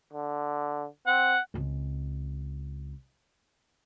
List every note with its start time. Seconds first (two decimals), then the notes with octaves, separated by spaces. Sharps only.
0.13 D3
1.07 C4 F#5
1.54 C#2 C4